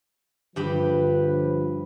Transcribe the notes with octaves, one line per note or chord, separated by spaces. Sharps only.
G2 D3 F3 G4 B4 B5